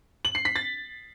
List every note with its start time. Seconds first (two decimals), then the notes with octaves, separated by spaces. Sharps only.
0.25 F#7
0.35 C7
0.45 B6
0.56 A6